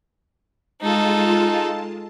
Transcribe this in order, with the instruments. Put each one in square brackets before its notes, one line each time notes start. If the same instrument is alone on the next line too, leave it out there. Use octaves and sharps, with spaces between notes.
[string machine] G#3 F4 A5 [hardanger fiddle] D#4 A4